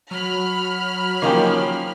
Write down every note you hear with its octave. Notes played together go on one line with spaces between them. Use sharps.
F#3 B5 F6
D#3 F3 A#3 C#4 G4